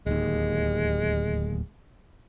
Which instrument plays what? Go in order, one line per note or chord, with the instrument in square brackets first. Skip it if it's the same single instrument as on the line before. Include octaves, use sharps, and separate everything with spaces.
[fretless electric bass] D1 D#2 [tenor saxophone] G#3